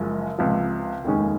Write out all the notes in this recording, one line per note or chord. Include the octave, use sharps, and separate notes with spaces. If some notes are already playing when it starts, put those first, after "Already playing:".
Already playing: F#1 F#2 F3 G#3
C#2 C3 F3
F1 D#2 D#3 G#3 C#4